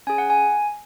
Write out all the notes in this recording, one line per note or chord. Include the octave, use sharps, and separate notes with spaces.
C#4 G#4 G#5
F#5
G#5